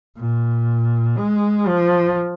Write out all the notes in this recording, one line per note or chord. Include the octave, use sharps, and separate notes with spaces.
A#2
G#3
F3